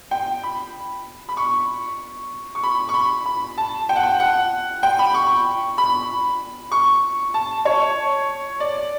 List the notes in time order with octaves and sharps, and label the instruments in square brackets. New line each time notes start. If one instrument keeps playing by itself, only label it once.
[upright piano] G5
B5
B5
C#6
C#6
B5
C#6
B5
B5
A5
G5
F#5
G5
F#5
G5
B5
C#6
B5
C#6
A5
C#5
D5